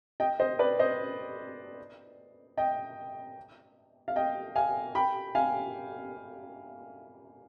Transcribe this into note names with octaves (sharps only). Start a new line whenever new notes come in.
D#5 G5
C5 D#5
B4 D5
C5 D#5
D#5 G5
F5
D#5 G5
F5 G#5
G5 B5
F5 G#5